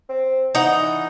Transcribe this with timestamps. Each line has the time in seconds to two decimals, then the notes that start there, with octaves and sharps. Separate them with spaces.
0.09 C4
0.55 E3 D#4 F#5